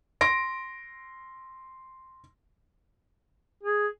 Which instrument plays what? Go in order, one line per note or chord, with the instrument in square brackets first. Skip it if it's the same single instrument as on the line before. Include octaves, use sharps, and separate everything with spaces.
[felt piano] C6 A#6 D7
[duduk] G#4